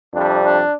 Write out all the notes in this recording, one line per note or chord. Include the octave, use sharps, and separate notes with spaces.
F2 C3 G3 D4
D4